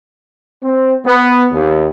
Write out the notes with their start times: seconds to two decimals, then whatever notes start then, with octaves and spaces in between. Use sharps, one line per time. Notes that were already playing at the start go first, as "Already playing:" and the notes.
0.64 C4
1.05 B3
1.52 D#2